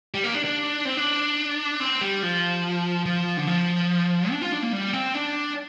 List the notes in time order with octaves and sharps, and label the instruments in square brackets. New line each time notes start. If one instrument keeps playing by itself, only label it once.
[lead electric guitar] G3
A#3
D4
D4
C4
D4
C4
G3
F3
F3
D3
F3
D4
F4
D4
A#3
G3
C4
D4